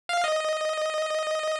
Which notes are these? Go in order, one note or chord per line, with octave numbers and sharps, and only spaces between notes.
F5
D#5